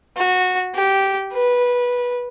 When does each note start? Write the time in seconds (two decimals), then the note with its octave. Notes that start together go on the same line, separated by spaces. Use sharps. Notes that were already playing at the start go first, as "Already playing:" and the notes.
0.17 F#4
0.75 G4
1.33 B4